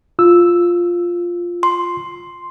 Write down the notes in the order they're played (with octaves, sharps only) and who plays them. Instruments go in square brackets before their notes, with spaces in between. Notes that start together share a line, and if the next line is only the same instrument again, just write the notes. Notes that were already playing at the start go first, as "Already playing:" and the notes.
[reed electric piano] F4 E6
[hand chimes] C6